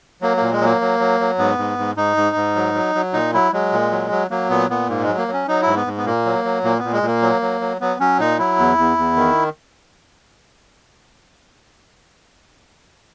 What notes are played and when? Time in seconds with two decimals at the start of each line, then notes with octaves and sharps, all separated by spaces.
0.22 F#3 A#3
0.37 A#2 A#3
0.52 G#3
0.61 F#3 A#3
0.81 F#3
0.99 F#3
1.20 F#3
1.39 G#2 B3
1.58 G#2
1.78 G#2
1.97 G#2 D#4
2.17 G#2
2.36 G#2
2.56 F#3
2.75 F#3
2.95 F#3
3.13 A#2 D#4
3.34 F#3 E4
3.53 F#3 G#3
3.73 A#2
3.91 F#3
4.11 F#3
4.31 F#3 A#3
4.50 A#2 B3
4.70 A#2 B3
4.89 G#2 A#3
5.03 G#3
5.09 F#3
5.18 A#3
5.28 F#3
5.33 C#4
5.48 F#3 D#4
5.62 E4
5.67 G#2
5.76 B3
5.87 G#2
5.98 B3
6.05 A#2 A#3
6.25 F#3
6.45 F#3
6.64 A#2 A#3
6.79 B3
6.84 A#2
6.93 G#3
7.03 A#2 A#3
7.22 F#3
7.41 F#3
7.61 F#3
7.81 F#3 B3
8.00 F#3 C#4
8.19 A#2 D#4
8.39 F#3 E4
8.59 E2
8.78 E2
8.98 E2
9.16 D#3